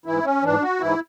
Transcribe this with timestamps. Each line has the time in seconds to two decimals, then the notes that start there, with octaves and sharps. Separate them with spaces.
0.06 G#2 E3 E4
0.25 C#4
0.43 G#2 E3 D4
0.62 F#4
0.80 G#2 E3 E4